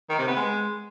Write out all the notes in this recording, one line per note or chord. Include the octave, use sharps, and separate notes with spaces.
D#3
C3
B3
G#3